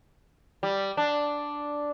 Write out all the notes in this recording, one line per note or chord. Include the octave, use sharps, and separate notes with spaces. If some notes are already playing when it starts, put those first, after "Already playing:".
G3
D4